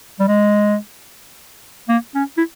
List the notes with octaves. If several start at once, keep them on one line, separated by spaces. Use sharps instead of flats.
G3
G#3
A#3
C#4
E4